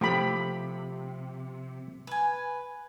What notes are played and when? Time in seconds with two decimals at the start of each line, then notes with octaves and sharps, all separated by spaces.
0.01 C3 F3 A3 G4 B5
2.07 B4 G#5